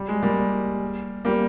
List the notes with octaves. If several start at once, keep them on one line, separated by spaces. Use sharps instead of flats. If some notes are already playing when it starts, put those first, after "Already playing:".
Already playing: G3
G#3
G3 A#3
G3 A#3